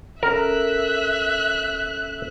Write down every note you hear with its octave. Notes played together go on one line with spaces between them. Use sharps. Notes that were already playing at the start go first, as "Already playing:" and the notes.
C#4 A4 A#4 E5 A#5 F#6